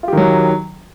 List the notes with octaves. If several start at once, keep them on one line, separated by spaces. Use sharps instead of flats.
D#3 F#3 F4 G4